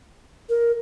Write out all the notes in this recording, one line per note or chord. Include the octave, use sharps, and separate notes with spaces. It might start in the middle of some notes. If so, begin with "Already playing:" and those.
A#4